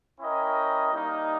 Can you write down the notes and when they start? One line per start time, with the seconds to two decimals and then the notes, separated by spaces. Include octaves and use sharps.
0.20 C#4 E4 A#4 D#5 G5
0.92 G3 A#3 D#4